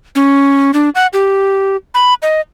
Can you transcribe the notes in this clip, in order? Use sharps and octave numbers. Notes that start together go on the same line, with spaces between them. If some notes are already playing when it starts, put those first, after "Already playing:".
C#4
D4
F#5
G4
B5
D#5